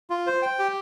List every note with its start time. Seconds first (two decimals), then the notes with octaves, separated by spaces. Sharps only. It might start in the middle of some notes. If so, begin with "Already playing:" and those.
0.10 F4
0.27 C5
0.42 G5
0.59 G4